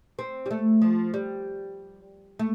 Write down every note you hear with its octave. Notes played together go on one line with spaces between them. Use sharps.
C4
G3
A3
F3
G3
A3